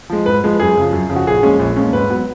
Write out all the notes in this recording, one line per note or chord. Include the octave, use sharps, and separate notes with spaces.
F3 G#3
G#2 B4
F3 G#3
F#2 G#4
C#3 F3
F#2
C#3 F3
F#4
A#1 G#4
A#2 F3 G#3 C#4
A#1
A#2 F3 G#3 C#4
G#2 B4
F#3 B3